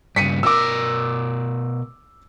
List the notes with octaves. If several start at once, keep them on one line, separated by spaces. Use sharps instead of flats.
G2 C#3 B6 C#7 D#7
B2 A#4 D6 E6